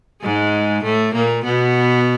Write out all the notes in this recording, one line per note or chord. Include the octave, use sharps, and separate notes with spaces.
G#2 G#3
A2 A3
A#2 A#3
B2 B3